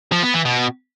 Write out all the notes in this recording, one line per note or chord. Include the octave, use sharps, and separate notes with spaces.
F3
B3
E3
B2